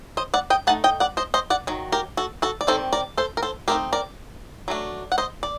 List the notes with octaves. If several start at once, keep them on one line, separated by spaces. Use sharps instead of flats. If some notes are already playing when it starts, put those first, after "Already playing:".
C5 D#5
D5 F#5
D#5 G5
A3 D#4 F#5 A5
D#5 G5
D5 F#5
C5 D#5
C5 D#5
D5 F#5
D#3 F#3
G4 A#4
F#4 A4
F#4 A4
D5
D#3 G3 C4 A4 C5
A#4 D5
A4 C5
A#4
A4 C5
A3 C4 D#4 G4 A#4
A#4 D5
F#3 A3 D4
F#5
C5 D#5
D5